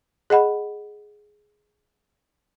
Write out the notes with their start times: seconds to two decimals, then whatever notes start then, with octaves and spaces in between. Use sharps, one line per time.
0.30 G#4 D#5 F#5 B5